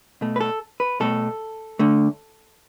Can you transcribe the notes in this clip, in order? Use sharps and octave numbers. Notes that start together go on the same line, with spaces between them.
B2 A3
B4
A4
B4
B2 A3 A4
D3 A3